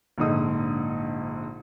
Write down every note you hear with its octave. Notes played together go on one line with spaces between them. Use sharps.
A#1 G#2 D3 D#4 D#6